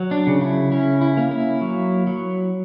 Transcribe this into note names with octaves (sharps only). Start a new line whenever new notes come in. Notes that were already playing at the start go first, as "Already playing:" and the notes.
Already playing: F#3
D4
C#3
E4
C#4 E4
E4
A#3
E4
F#3
F#3